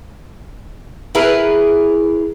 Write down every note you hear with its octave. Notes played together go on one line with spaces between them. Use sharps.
E4 G#4 A#4 B4